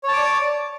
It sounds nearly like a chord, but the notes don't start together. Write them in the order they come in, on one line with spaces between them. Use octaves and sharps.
C#5 A5 D6 D5